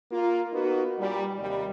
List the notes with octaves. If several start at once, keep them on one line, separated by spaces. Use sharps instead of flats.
A#3 F4
A#3 B3 D#4 F#4
A#2 G3
D#2 C3 G3